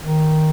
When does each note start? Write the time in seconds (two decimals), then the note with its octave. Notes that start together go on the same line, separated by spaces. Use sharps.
0.01 D#3